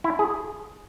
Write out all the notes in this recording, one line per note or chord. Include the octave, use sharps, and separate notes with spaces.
E4
G#4